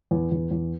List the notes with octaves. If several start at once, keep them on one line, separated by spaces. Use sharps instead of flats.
E2
E2
E2